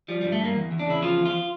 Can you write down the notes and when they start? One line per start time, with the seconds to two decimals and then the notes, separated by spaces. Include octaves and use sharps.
0.08 F3 G3
0.21 G2 G3
0.32 A3
0.40 G2 A#3
0.55 E2
0.71 E2
0.79 D4
0.86 C#3 E4
1.02 F3 F4
1.19 E2
1.25 F4